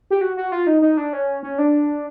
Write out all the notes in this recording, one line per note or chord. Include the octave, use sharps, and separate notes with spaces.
G4
F#4
F#4
F4
D#4
D#4
D4
C#4
C#4
D4